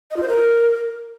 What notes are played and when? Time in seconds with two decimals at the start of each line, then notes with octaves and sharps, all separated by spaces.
0.11 D#5
0.17 F4
0.22 C5
0.28 A#4